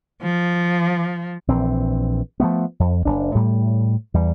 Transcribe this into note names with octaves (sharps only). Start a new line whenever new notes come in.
F3
A#1 E3 C4
F3 G3 A3 B3
F2
F#1 D4
A2 G3
E2 G3